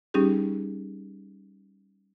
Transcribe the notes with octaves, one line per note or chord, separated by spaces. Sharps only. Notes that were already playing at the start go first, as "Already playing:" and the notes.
G3 C#4 D#4 G4 G#4